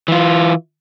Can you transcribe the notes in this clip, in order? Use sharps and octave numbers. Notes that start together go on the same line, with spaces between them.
E3 F4